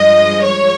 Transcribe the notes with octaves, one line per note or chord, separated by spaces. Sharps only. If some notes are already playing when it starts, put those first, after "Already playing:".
Already playing: G2 F3 G#3 D#5
C#5